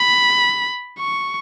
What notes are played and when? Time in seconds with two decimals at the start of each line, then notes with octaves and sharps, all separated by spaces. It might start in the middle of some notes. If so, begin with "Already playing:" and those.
Already playing: B5
0.99 C#6